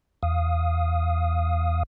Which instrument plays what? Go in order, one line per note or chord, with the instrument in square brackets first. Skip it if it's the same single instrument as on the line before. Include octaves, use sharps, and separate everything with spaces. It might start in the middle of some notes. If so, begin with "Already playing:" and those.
[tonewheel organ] E2 F5 D#6